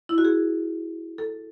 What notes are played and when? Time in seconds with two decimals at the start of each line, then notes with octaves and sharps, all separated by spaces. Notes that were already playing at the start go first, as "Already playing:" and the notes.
0.09 E4
0.18 F#4
0.25 G#4
1.18 A4